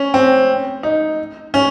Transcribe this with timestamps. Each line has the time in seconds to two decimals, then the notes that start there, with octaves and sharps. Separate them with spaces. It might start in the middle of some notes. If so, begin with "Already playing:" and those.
Already playing: C#4
0.14 C4
0.83 D#4
1.54 C#4